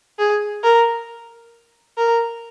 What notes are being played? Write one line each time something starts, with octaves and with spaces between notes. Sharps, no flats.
G#4
A#4
A#4